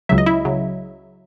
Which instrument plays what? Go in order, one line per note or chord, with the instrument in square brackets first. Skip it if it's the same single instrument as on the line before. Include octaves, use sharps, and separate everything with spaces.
[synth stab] C#2 C#3 F#3 E5
D#5
E4 E5
C#3 F#3